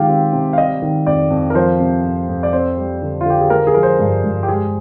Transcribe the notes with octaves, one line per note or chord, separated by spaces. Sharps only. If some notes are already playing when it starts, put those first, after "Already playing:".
Already playing: D#3 G#3 F4 G4 F5
C4
C3
F5
G3 D#5
D#3
F2 D5
F2
A#4
F3 C5
C3
F2
F2
D5
C4 C5
G3
D3
F4
D3 G4
G#4
A#3 A#4
G#4
F3 A#4
C5
G2
G2
G4
G#3 G#4